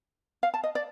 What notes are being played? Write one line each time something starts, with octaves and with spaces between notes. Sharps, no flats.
F5
A5
D#5
D5